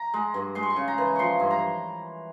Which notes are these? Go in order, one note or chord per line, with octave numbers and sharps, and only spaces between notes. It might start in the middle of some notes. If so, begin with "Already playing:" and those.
Already playing: A#5
G#3
G2
G#3 C6
C#6
C6
C#3
A#5
E3
F3 C6 C#6
G2
A#5